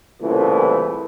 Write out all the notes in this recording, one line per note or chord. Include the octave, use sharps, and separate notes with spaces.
C2 A#2 C#3 E3 A3